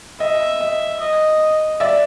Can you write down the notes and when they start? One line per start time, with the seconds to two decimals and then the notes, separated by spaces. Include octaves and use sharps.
0.20 D#5 E5
0.60 D#5
1.00 D#5
1.80 D5 E5